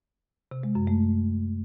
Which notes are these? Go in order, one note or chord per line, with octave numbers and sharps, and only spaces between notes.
C3
G#3
F#2
A3